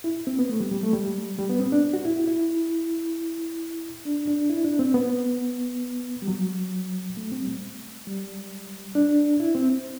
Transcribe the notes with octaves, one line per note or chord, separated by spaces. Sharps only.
E4
C4
B3
A3
G3
G3
A3
G3
G3
B3
C4
D4
F#4
E4
E4
E4
D4
D4
E4
D4
C4
B3
G3
F#3
A3
C4
G3
A3
G3
D4
E4
C4